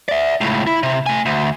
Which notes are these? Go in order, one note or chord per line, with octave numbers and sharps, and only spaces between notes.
D5 E5
C#2 A2
E4
C3
A3 G#5
D2